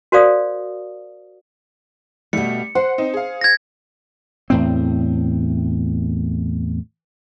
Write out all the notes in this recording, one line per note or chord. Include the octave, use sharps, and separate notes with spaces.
F#4 A#4 C5 D5 F5 D#6
B2 G3 A3 C#7
C5 F#5
C4 D#4
G#4 F5
G#6 A#6
E2 A2 C4